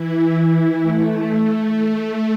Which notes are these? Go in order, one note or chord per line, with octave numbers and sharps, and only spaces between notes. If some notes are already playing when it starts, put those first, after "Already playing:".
Already playing: E3 E4
A3